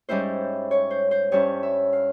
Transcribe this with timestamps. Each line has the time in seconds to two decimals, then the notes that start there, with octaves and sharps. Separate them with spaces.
0.09 G#2 G3 C#4 E4 C5
0.71 C#5
0.91 C5
1.11 C5
1.32 G2 G3 C#4 E4 C#5
1.63 E5
1.93 F5